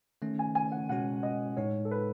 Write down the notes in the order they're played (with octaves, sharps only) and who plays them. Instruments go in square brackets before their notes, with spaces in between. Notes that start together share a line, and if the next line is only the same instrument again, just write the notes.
[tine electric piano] D#3 A3 C#4
[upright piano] G#5
G#5
F#5
[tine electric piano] B2 G#3 C#4 F#4 [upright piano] F#5
[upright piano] D#5
[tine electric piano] A2 G#3 D#4 [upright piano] C#5
[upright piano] A4
B4